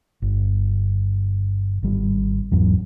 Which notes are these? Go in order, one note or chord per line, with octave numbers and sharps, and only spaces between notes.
G1
G#1 G3
E2 G#2 F#3